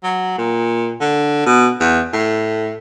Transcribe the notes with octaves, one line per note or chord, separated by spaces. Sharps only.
F#3
A#2
D3
B2
E2
A2